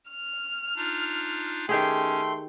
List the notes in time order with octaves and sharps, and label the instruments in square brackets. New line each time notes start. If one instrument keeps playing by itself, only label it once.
[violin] F6
[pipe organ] D4 D#4 F4
[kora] D#3 G4 G#4 [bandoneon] A3 C6 [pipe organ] C#4 [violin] G5